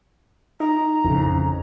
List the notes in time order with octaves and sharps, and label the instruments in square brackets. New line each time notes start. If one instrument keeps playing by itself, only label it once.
[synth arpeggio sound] D#4 [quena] A#5
[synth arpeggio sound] A1 A2 [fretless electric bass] F2 C#3